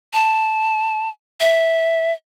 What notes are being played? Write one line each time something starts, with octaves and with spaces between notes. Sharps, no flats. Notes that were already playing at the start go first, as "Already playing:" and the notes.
A5
E5